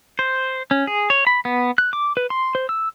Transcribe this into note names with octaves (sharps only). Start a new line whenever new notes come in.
C5
C#4
G#4
C#5
B5
B3
F#6
D6
B4
C6
C5
E6